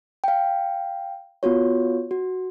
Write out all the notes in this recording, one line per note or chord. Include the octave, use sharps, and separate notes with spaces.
F5 G5
B3 F4 F#4 C#5
F#4